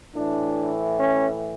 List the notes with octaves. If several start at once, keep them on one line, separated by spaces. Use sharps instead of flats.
A2 E3 D4
C#4